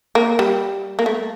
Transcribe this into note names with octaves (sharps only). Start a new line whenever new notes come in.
A#3
G3
A#3
A3